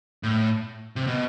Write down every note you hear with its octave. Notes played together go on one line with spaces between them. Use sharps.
A2
C3
B2